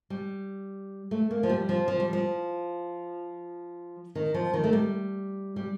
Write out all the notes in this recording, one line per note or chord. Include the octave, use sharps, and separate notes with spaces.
G3
A3
A#3
F3
G3
F3
F3
G3
F3
D#3
F3
D#3
A3
G3
G3